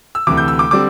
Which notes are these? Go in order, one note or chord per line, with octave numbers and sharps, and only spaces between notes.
E6
D2 C3 E3 D6
G6
E6
D6
D3 G3 C4 D6